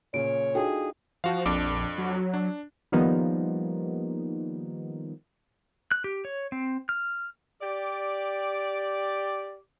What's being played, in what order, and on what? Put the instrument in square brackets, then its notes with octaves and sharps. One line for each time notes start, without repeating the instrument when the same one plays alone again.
[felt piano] A#2 C#3 [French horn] C#5 [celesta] D7
[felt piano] D4 D#4 F4 [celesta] F#4 A4 G5 [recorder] G#4
[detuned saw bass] F3 [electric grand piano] F#4 F5
[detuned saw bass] A#1 [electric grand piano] F2 D4 D6
[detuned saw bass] F#3
[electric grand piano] D4
[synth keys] D#3 F3 G3 A#3 B3 D#4
[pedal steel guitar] F#6
G4
C#5
C4
F6
[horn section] G4 D5